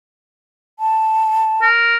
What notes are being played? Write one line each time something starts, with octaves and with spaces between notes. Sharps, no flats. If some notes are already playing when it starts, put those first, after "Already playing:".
A5
A#4